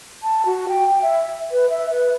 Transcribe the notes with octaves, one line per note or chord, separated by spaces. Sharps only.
A5
F#4
G5
E5
B4
E5
B4